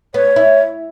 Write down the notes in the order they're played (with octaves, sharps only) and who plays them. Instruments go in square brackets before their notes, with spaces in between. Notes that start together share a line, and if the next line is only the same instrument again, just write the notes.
[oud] B3 [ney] C#5
[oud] E4